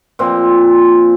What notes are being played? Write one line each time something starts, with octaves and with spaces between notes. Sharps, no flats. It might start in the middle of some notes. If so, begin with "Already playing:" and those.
A#2 F3 C4